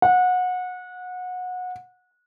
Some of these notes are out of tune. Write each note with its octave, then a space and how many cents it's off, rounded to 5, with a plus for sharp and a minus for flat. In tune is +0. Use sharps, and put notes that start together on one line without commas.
F#5 -25